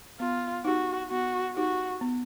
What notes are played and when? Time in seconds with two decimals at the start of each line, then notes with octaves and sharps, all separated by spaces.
0.20 B3 F4
0.65 D#4 F#4 G4
1.10 B3 F#4
1.56 D#4 F#4 G4
2.01 B3